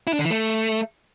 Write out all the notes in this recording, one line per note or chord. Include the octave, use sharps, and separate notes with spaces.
E4
D4
D3
E3
A3